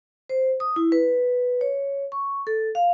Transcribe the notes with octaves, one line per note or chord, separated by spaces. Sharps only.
C5
D#6
E4
B4
C#5
C#6
A4
F5